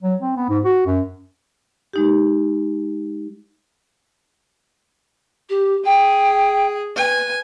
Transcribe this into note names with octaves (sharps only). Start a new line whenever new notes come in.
F#3
C4
B3
G#2
F#4
F#2
G#3 D#4 G4
G4
G#4 G5
B4 G#5